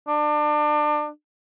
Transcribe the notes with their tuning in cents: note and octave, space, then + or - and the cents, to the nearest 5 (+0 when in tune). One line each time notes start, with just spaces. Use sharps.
D4 +30